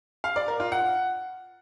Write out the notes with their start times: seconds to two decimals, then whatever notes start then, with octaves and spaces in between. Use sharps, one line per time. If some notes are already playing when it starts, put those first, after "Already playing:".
0.24 F5
0.36 D5
0.48 A#4
0.60 F4
0.72 F#5